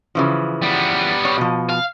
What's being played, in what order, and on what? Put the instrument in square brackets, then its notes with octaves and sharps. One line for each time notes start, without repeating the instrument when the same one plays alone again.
[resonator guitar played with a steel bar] C#3 E3 F3
[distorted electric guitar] G3 B3
[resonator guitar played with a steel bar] C#5
B2 F3
[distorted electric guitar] F5